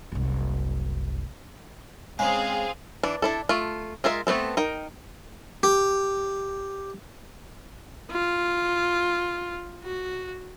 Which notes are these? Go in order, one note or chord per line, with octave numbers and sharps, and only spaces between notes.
F#1 C2
C#3 G#3 C4 G#4 F5
E3 D4
D4 E4 A4
A3 F4
G#3 F4 A#4 E5
A3 B3 C4 A4
D#4 A#4 G5
G4
F4
F#4